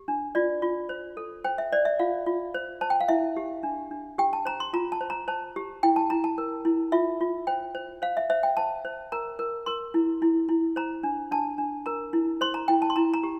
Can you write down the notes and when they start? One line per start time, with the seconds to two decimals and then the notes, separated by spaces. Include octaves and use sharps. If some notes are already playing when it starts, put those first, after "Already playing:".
Already playing: G4
0.08 D4
0.35 F4 D5
0.62 F4
0.89 C5
1.17 A4
1.44 C5 G5
1.58 E5
1.72 C5 D5
1.85 E5
1.99 F4 F5
2.26 F4
2.54 C5
2.81 C5 A5
2.90 G5
3.01 F5
3.08 E4 E5
3.37 G4
3.63 D4
3.91 D4
4.18 G4 G5
4.33 A5
4.45 C5 A#5
4.60 C6
4.73 F4 A#5
4.92 A5
5.01 C5
5.10 A#5
5.28 C5 A5
5.56 G4
5.83 E4 G5
5.96 A5
6.10 E4 A#5
6.24 A5
6.38 A#4
6.65 E4
6.92 F4 E5
7.21 F4
7.47 C5 G5
7.75 C5
8.02 C5 F5
8.17 E5
8.30 C5 E5
8.43 G5
8.57 C5 A5
8.85 C5
9.12 A#4 A#5
9.39 A#4
9.66 A#4 C6
9.94 E4
10.22 E4
10.49 E4
10.76 C5 A#5
11.03 D4
11.31 D4 A5
11.58 D4
11.86 A#4 A#5
12.13 E4
12.41 C5 C6
12.54 A#5
12.68 E4 G5
12.82 A5
12.90 C6
12.96 E4 A#5
13.14 A#5
13.23 G4